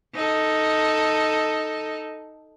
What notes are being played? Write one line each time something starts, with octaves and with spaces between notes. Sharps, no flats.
D#4 A4